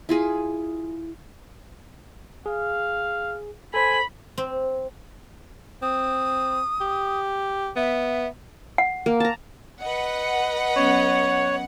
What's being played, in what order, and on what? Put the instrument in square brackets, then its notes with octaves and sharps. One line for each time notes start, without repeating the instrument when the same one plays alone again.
[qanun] E4 F4 G#4
[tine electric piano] G#4 [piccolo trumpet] F5
[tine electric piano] A4 C5 [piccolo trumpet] G#5 [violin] B5
[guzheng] C4
[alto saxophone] C4 [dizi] D#6
[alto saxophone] G4
[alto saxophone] B3 [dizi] E5
[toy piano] F#5
[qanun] A#3
A5 A#5
[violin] B4 D#5 [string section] F#5
[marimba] F#3 B3 C#4 [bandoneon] C#5